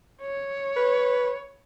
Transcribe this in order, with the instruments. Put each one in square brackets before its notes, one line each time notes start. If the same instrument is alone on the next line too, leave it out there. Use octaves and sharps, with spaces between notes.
[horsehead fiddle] C#5
[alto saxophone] B4